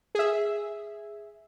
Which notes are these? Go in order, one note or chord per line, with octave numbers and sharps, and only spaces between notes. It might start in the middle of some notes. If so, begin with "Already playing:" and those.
G#4 E5